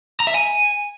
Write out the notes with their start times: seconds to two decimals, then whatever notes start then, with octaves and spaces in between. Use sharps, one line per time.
0.20 A#5
0.27 E5
0.34 G#5